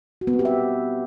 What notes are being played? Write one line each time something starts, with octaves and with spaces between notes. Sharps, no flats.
F#4
B3
C4
G4
E5